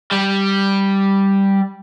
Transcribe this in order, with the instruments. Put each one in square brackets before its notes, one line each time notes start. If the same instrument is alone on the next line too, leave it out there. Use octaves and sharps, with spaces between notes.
[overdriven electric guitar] G3